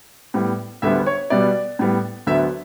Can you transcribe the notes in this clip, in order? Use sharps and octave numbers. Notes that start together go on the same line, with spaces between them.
A2 G3 B3
D2 D3 G3 B3 E5
C#5
B2 G3 B3 D5
A2 G3 B3
D2 D3 F#3 B3 E5